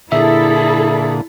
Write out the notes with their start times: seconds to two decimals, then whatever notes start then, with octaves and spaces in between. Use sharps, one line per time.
0.12 A#2 D3 E4 G#4 A4 E5